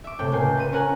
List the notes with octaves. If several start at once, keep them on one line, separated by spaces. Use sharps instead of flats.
E5 D6
A2 C3 G5
C#2 A#3 G#5 G6 C7
B4 C5 D#7
C#4 A#4 F#5 G#5 A#5